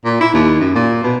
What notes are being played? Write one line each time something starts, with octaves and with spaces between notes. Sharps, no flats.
A#2
E4
D#2
F#2
A#2
B2